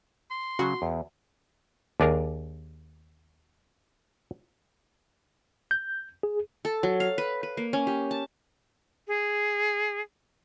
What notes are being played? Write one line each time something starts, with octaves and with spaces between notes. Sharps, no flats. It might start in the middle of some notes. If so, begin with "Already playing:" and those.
C6
C#3 F#3 F#4
E2
D#2 D4 G#4 A#4
G6
G#4
A4
F#3
F5
B4
B4
A#3
C#4
G4
A5
G#4